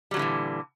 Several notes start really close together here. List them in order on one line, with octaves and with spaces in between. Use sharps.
G3 F#3 D3 E3 A#2